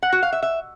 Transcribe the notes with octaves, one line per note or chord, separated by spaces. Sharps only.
F#5
F#4
F5
E5
E5